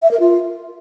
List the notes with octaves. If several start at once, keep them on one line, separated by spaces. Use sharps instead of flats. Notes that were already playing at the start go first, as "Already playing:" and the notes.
E5
A#4
F4